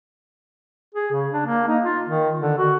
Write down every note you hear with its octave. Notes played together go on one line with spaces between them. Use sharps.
G#4
C#3
D4
A#3
D#4
F4
D#3
D3
F#4